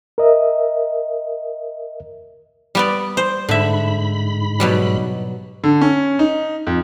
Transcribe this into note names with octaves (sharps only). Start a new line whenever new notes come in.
A#4 D#5 E5
G3 B3 D5
C5
G#2 D3 E5 B5
B2 F#3 G3
D3
C#4
D#4
F2